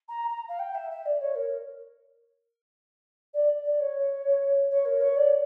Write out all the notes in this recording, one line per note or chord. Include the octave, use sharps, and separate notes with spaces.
A#5
A#5
F5
G5
E5
E5
D5
C#5
A#4
D5
D5
C#5
C#5
A#4
C#5
D5